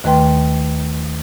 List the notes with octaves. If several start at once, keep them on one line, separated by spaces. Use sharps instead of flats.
D#2 D#3 A3 B4 G5 C6